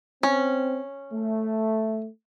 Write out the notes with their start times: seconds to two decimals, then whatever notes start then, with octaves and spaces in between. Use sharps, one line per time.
0.23 C4 C#4
1.12 A3